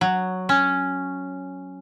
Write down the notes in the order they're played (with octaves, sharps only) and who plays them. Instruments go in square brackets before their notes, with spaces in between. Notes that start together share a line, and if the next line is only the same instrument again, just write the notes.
[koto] F#3
C#4